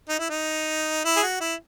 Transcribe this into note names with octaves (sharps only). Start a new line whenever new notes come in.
D#4
E4
D#4
E4
G#4
F#4
E4